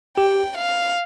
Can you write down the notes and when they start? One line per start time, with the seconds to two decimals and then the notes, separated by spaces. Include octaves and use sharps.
0.17 G4 G5
0.57 F5